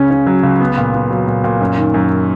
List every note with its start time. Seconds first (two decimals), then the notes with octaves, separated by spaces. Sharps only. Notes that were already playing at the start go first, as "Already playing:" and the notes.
Already playing: C#2 C#3 C#4
0.10 C#4
0.27 F#3
0.43 C#2
0.60 B3
0.78 A#2
0.94 B3
1.11 F#3
1.27 A#2
1.44 A#2
1.61 F#2
1.77 D#3
1.94 F#2